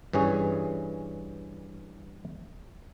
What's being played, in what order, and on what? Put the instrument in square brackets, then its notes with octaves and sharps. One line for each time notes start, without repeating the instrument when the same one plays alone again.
[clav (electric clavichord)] G2 E3 C#4 G#4 G#5